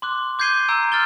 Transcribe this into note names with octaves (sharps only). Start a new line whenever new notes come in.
C6 D6 F#6
D6 G6 G#6 C7 D#7 G7
A#5 E6 G6 D7
C6 E6 F6 A6 G7